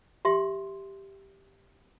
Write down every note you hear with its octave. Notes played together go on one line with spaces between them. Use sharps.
G4 E5 C6